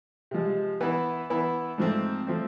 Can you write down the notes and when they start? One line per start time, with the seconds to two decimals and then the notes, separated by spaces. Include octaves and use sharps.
0.31 C3 F3 G#3
0.81 E3 B3 E4
1.30 E3 B3 E4
1.78 G#2 F3 A3 C4
2.27 F3 A3 C4